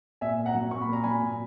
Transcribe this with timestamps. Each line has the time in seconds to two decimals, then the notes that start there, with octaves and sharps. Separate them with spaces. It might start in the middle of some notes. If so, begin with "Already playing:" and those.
0.21 A#2 E5 G#5
0.38 A#2
0.46 F#5 A#5
0.55 F#3
0.71 A#2 C#6
0.82 B5
0.89 A#2 A#5
1.04 F#3 G#5 B5
1.22 A#2